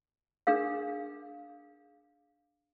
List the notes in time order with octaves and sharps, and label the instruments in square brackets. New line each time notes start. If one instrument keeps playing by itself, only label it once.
[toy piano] D4 G#4 A#4 F5